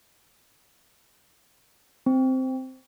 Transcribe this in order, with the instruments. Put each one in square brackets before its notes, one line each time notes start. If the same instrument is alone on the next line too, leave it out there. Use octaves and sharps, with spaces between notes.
[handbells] C4